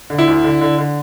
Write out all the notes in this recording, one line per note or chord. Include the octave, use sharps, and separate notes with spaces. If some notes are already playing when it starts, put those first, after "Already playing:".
D3
E4
D2
D3
D3
D3